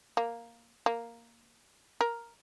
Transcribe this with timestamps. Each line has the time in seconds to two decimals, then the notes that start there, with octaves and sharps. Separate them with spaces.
0.17 A#3
0.86 A#3
2.01 A#4